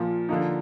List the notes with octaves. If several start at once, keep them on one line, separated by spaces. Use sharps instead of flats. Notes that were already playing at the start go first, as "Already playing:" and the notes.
Already playing: A#2 F3 A#3
D3 F3 A#3 D#4